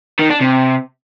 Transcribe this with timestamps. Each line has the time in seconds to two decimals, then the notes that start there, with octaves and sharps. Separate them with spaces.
0.20 D#3
0.30 D4
0.41 C3